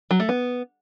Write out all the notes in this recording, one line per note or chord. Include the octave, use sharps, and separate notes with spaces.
F#3
A3
B3